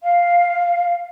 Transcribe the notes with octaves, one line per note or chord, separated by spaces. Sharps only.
F5